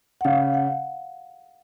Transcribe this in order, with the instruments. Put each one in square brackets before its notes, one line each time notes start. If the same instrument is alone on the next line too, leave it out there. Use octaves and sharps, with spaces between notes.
[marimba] F#5
[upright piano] C#3 [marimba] F5
[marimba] F#5